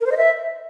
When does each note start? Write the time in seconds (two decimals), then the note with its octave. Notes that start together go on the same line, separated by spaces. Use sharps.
0.01 A#4
0.06 C5
0.12 D#5
0.17 E5